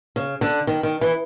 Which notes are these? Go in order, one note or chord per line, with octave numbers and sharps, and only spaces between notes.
C#3
D3
D#3
D#3
E3